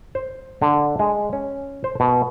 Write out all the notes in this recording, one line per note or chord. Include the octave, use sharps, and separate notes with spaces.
C5
D3
G#3
C#4
C5
B2